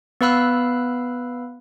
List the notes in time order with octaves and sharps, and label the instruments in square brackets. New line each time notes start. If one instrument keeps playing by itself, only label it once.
[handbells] B3 B4 F5 B5 E6 F#6